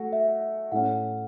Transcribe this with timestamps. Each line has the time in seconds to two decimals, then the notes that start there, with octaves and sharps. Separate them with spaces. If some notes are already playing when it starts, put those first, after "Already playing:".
Already playing: A3 F#4
0.13 E5
0.72 A2 A3 C#4 F#5